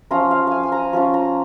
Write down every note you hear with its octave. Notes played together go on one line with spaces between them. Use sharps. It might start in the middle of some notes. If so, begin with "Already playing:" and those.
F3 C#4 F4 A#5
F5
F5 G#5
G#5
A#5
F3 C#4 F4 C#6
A#5